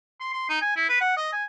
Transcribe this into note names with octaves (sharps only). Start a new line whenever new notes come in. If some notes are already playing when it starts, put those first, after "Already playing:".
C6
C6
D#4
G#5
E4
B4
F#5
D#5
G#5